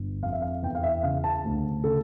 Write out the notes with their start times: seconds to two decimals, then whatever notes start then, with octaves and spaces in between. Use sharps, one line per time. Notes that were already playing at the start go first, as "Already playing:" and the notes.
Already playing: G1
0.23 F2 F5
0.32 E5
0.42 F5
0.63 E2 G5
0.75 F5
0.83 E5
1.03 C#3 F5
1.24 A5
1.44 D2
1.84 C#3 A4